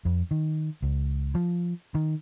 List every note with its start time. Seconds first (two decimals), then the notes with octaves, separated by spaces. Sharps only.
0.05 F2
0.31 D#3
0.82 C#2
1.35 F3
1.95 D#3